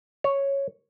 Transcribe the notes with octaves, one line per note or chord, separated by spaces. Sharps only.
C#5